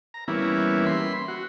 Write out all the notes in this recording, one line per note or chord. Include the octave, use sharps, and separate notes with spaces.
A#5
E3 G3 A#3 B3 C#4 E4
B5 C6
F#4